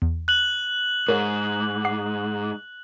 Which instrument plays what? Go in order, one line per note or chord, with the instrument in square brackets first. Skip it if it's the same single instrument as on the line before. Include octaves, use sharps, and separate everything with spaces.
[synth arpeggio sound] E2
[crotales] F#6 F#7
[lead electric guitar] G#2 [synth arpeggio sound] A#4 C#5
[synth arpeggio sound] F#5 D6 C7